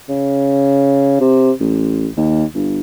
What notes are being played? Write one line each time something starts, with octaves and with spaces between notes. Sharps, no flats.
C#3
C3
A1
D#2
G1